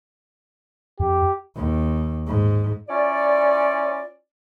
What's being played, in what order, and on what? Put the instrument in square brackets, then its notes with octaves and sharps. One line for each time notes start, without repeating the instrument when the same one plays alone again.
[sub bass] F2 [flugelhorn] G4
[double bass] D#2
G#2
[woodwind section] C#4 E4 F4 C#5 D5